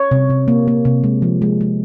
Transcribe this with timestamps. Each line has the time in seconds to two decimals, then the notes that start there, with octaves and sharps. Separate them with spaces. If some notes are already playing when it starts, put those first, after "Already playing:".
Already playing: C#5
0.11 C3
0.30 C3
0.48 A#3
0.68 A#3
0.85 C3
1.04 G#3
1.22 F3
1.42 G#3
1.61 G#3